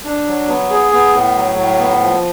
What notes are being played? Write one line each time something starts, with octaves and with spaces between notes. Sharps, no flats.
D4
F#3
B3
G#4
B3
A2
F#3
A2
B3
F3